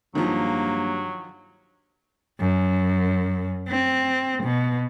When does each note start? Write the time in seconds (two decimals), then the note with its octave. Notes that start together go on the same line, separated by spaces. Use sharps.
0.15 G2 D#3 F3 F#3 A#3
2.39 F#2
3.68 C4
4.43 B2